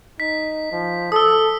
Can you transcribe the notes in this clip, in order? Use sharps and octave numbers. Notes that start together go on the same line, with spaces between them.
D#4 B6
F3
A4 D#6 E6